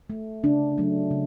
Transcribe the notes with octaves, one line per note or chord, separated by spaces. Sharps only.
A3
C#3 D4
F#3 A3
C#3